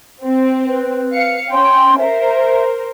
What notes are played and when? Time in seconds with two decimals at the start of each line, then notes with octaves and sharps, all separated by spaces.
0.23 C4
0.65 B4
1.13 F5 C#7
1.52 C#4 G5 C6
1.99 A#4 C5 E5